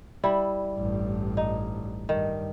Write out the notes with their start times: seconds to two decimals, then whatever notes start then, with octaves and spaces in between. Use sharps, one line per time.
0.24 G3 E4
0.74 A1 G2
1.37 D#4
2.09 G2 D#3